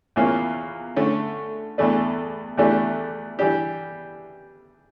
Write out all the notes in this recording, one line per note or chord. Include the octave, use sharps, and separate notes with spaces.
E2 E3 A#3 C#4 F4
D3 A3 C#4
E2 E3 A3 D4
E2 E3 A3 D4 G4
E3 G3 D4 G4